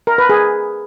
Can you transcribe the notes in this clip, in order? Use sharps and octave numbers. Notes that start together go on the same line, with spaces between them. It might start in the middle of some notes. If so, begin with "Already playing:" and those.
A#4
B4
G#4